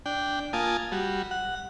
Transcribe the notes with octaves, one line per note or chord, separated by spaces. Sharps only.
D4 G5
A#3 F4 G#5 A5 D#6
G3 F#4
F#5